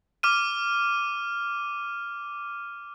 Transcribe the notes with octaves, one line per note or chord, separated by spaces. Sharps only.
D6 F6 D#7